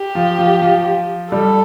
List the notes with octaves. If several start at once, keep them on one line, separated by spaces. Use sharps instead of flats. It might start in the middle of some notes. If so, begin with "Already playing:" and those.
Already playing: G4
F3
F3
F3
G3 A4